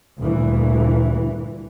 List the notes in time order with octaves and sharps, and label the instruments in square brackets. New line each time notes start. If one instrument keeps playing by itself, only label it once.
[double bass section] D2 G2 A#2 E3